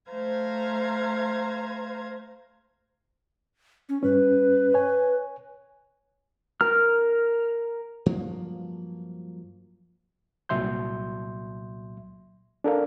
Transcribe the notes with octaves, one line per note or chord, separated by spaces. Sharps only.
A3 C5 F5 A#5 G#6
C#4
G2 C#4 B4
C#5 G#5
A#4 F6
G2 F3 F#3 A#3
C2 A#2 F#3 E5 C6 G6
D4 A4 A#4 F5